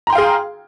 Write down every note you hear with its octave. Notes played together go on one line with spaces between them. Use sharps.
G#4 F5 G5 A#5 C6